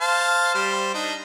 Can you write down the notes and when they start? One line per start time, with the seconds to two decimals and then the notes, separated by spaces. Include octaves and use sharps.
0.01 C5 F5 A5
0.54 G3 C5
0.94 D4 D#4